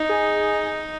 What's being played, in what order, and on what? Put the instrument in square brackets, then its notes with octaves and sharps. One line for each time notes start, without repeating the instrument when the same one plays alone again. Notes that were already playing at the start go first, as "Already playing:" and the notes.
Already playing: [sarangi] D#4
[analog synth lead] G#4